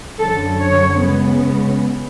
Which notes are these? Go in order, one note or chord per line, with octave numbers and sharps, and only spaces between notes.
F#2 D3 F#3 A4
C#5
C#3 G#3 B3